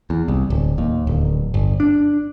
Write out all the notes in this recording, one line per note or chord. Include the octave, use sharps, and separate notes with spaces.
E2
C2
D1
D#2
D1
G1
D4